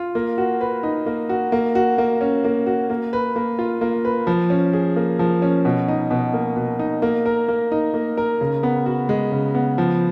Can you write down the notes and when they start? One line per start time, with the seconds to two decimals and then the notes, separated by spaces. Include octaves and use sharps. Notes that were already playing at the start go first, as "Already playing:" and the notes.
Already playing: F4
0.15 A#3
0.38 F#4
0.61 B4
0.83 D#4
1.06 A#3
1.29 F#4
1.52 A#3
1.75 F#4
1.98 A#3
2.21 C#4
2.44 A#3
2.66 F#4
2.90 A#3
3.13 B4
3.36 A#3
3.59 F4
3.81 A#3
4.05 B4
4.27 F3
4.50 C#4
4.73 G#4
4.96 A#3
5.19 F3
5.42 C#4
5.65 B2
5.88 D#4
6.11 B2
6.33 A#3
6.56 B2
6.79 D#4
7.02 A#3
7.26 A#4
7.48 A#3
7.72 D#4
7.94 A#3
8.17 A#4
8.41 C#3
8.63 B3
8.86 F#4
9.09 G#3
9.32 C#3
9.55 B3
9.78 F3